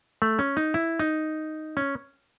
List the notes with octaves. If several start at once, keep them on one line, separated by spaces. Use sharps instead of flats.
A3
C#4
D#4
E4
D#4
C#4